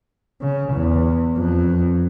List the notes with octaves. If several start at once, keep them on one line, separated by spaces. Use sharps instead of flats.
C#3
E2
F2